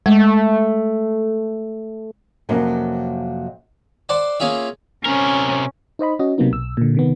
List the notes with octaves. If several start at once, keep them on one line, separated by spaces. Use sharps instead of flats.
G#3 A3
F2 C3 F#3 A#3 C4 C#4
C5 D5 F#5 A5 C6
A#3 C#4 F4 G#4 E5
C3 C#4 A#4
D#4 C5 D#5 B5
C#4 F#4 D#5
C3 F#3 A#3 B3 D#4
B1 E6
A#2 D3
C3 D#3 B3